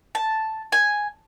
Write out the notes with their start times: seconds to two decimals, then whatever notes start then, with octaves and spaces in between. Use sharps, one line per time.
0.15 A5
0.72 G#5